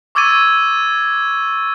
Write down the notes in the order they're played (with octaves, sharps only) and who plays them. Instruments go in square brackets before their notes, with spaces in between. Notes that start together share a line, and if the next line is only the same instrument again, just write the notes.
[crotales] C#6 D6 E6 G#6 A6 D#7